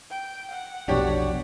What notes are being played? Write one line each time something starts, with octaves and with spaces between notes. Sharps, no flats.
G5
F#5
F1 B1 B2 D4 G4 C#5